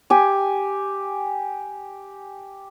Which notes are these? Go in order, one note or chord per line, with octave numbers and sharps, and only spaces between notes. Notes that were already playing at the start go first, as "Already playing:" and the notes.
G4 G#5